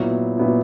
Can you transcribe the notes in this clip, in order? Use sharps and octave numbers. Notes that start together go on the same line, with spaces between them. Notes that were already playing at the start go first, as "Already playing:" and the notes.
Already playing: A#2 F#3 B3 E4
A#2 F#3 B3 E4